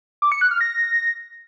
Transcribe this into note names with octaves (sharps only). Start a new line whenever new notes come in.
D6
C#7
F#6
F6
A#6